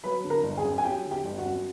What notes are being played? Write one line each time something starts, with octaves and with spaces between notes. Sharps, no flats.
F#3 B4 B5
D3
A#4 A#5
G1
G#4 G#5
F#2
G#5
F#3 G4 G5
D3
G4 G5
G1
F#4 F#5
F#2